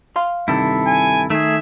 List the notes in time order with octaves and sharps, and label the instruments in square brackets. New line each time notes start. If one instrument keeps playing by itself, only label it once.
[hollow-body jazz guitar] F5 C6
[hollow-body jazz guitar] G2 C3 D#3 [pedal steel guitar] E4 A4
[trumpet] G#5
[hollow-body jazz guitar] D#3 [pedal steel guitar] A3 G#4 [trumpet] E5